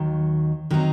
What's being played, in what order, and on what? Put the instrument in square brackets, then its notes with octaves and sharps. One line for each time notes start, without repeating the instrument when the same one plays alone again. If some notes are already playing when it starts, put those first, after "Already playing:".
Already playing: [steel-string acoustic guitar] D#2 D#3 F#3
D#3 F#3 C4 D#4